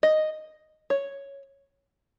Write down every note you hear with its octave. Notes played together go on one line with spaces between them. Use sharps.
D#5
C#5